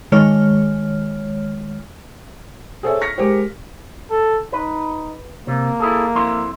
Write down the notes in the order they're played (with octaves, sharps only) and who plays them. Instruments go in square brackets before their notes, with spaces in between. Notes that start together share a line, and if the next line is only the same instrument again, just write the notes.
[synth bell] D#3 G#3 C#5 F6
[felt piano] G#4 A4 C5 C#5 E5
C#6 F6 A#6 B6 C#7
G#3 G4 A#4 C5
[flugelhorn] A4
[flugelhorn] D#4 [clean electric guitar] B4
[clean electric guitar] C3 [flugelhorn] A#3
[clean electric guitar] E4 G#4 A4
F2 E4 C6